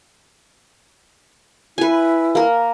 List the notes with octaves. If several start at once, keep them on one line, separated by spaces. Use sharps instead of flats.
E4 B4 G#5
A#3 A#4